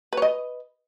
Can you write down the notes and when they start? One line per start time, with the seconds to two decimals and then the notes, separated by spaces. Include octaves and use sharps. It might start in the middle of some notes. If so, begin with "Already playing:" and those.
0.13 B4
0.17 C#5
0.22 D#5